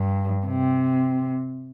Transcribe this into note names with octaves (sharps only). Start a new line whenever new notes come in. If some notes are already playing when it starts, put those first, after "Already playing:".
Already playing: G2
C3